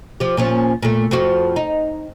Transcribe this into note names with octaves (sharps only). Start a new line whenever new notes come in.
F3 G4
A#2 F3 C#4
A#2 A3
F2 F3 F#4
D#4